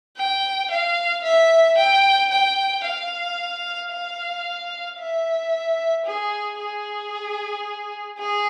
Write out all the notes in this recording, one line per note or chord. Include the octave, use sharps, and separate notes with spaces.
G5
F5
E5
G5
G5
F5
F5
E5
G#4
G#4
G#4